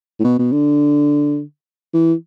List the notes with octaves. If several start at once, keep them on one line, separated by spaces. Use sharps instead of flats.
A2
B2
B2
D3
E3